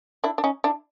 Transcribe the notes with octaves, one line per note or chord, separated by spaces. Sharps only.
D4 E4
D4
C#4 D#4
D4 E4